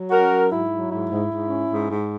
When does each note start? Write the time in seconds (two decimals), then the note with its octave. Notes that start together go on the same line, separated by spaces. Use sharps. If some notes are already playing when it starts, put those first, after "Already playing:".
Already playing: F#3
0.10 C#4 F#4 A#4
0.30 F#3
0.50 G#2 E4
0.69 F#3
0.89 G#2 E4
1.09 G#2
1.29 G#2
1.48 C#4
1.68 G#2
1.87 G#2